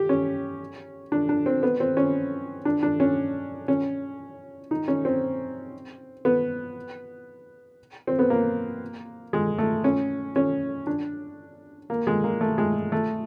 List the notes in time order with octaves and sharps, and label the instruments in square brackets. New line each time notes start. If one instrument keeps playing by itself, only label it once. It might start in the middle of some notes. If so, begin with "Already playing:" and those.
Already playing: [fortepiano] G4
C#4
D4
D4
C4
B3
C4
C#4
D4
D4
C#4
C#4
D#4
C#4
C4
B3
C4
B3
A#3
G#3
A3
C#4
C#4
D4
A#3
G#3
A#3
A3
G#3
A3